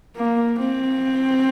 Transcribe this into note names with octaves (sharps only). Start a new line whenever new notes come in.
A#3
C4